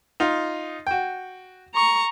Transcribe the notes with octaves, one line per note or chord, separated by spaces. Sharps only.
D#4 F4
F#4 G5
A#5 C#6